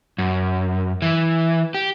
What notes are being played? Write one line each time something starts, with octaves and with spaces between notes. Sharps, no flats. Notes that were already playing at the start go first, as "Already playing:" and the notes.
F#2
E3
G4